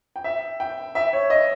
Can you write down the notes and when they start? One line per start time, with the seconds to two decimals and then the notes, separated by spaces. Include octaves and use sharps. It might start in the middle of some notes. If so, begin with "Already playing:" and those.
0.16 G5
0.24 E5
0.60 G5
0.95 E5
1.13 C#5
1.30 D#5